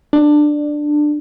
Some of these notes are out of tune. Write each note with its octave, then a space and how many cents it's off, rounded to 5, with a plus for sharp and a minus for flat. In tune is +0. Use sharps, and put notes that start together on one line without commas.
D4 +15